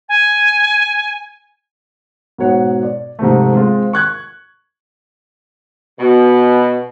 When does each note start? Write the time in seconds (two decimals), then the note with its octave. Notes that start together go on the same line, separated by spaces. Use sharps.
0.08 G#5
2.38 G#2 B2 C#5 F#5
2.83 D5
3.19 G#2 C3 F3 A3
3.53 G#3 C4 F4
3.93 C#6 F#6 G#6
6.00 B2